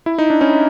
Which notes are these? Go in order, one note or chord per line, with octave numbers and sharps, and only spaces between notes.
E4
D#4
D4
C#4 D#4